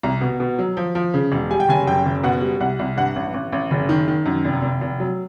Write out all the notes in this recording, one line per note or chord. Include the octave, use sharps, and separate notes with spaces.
C2 A#5
B2
B2
F#3
F3
F3
C#3
E1
G3 G#5
G5
F#1 G#5
F#2 G5
F#1
B2 F#5
G3
C2 F#5
C2
G2 F#5
A1
A1
A1
F#1
D#3
D#3
F#2
F1
F1
F1
F#3